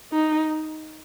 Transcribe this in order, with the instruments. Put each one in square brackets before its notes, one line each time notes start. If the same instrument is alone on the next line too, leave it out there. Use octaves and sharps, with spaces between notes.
[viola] D#4